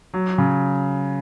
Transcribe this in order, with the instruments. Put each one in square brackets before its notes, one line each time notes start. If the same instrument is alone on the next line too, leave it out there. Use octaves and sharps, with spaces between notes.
[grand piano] F#3
C#3